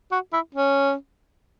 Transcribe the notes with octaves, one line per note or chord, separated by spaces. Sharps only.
F#4
E4
C#4